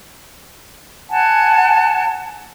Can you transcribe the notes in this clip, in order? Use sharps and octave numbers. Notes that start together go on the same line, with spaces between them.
F#5 G#5 A5